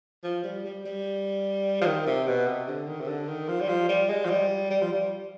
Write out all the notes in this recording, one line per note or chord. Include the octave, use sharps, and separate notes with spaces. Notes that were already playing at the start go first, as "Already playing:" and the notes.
F3
G3
G3
G3
F3
D#3
C3
B2
C3
D3
D#3
C3
D3
D#3
F3
G3
F3
G3
G#3
F3
G3
G3
F3
G3